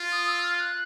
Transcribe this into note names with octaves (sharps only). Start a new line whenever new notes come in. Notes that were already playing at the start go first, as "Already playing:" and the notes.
Already playing: F4
D#6
E6
F6
F#6